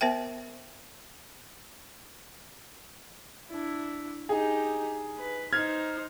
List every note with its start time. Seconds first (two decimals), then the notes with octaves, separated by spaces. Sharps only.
0.01 B3 A#4 C5 E5 G5
3.49 D4 E4
4.29 D#4 G4 G#4
5.18 B4
5.53 D#4 C5 F6 G#6